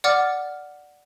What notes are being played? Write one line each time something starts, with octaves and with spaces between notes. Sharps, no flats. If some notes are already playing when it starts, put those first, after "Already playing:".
D5 F#5 D6 F6 A6